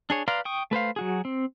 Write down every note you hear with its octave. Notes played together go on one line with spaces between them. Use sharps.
D4 G#4 C#5
B4 D5 F5 A#5 C6
G5 C#6 D#6
A3 B4 C5 F5
F#3 F#4 G#4
C4